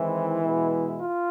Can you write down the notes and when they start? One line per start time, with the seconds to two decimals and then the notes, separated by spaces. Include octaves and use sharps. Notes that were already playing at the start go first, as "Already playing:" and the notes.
Already playing: D#3 E3 G#3 C4 E4
0.40 B2 G#3 B3
1.01 F4